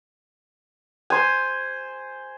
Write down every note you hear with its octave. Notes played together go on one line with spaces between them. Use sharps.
C5 G#5